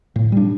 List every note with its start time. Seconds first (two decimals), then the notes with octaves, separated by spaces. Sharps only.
0.16 A2
0.32 G3 D4